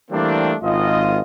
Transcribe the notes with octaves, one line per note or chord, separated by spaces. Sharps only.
E3 G3 A3 A#3 C4 D4
G#1 F4 D#5